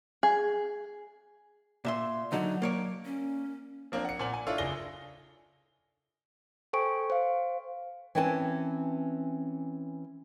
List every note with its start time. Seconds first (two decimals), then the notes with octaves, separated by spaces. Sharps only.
0.23 G#4
1.85 A#2 E5 C6
2.32 D3 F#3 D#4 F#4
2.62 A#3 C#5 D5
3.05 C#4
3.92 F3 A#3 C4 D4 D5
4.05 F#5 C#7
4.19 A#2 C4 G#5 F#7
4.34 G#5
4.46 D4 E4 F4 A4 C#5 D5
4.58 F#1 D4 G#4 A#6 G7
6.73 A4 C5 G5 G#5 C#6 D7
7.10 C5 F5
8.15 E3 C4 C#4 B4 G5 A5